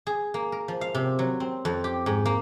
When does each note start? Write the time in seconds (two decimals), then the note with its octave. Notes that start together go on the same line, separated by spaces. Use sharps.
0.07 G#4
0.34 A#3
0.52 A#4
0.68 F3
0.81 F5
0.95 C3
1.19 F#3
1.40 C4
1.65 F2
1.84 G4
2.06 G#2
2.25 A#3